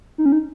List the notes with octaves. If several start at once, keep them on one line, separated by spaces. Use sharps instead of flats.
D#4
C#4
D#4